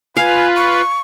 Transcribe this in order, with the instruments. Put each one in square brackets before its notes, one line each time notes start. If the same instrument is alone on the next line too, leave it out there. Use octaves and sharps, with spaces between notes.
[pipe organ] F4 B4 [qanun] F5 [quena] G#5
[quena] C#6